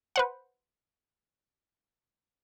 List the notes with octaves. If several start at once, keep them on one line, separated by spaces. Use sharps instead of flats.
B4 C5 F#5